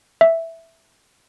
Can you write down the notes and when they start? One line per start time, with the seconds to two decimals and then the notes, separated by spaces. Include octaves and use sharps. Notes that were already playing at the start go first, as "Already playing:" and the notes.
0.21 E5